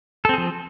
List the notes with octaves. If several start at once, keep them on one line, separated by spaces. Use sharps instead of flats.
F3 C4 G#4 A4